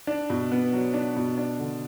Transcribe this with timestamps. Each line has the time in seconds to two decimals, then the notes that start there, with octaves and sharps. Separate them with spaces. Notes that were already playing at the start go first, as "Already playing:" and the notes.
0.07 D4
0.30 B2
0.52 B3
0.73 F#3
0.94 D4
1.16 B2
1.38 D4
1.59 D3